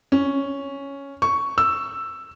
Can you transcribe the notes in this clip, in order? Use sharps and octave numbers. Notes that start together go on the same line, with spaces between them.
C#4
C#6
E6